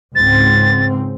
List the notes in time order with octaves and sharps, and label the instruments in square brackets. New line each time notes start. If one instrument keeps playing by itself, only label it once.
[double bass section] C#2 G#2 C4 [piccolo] A6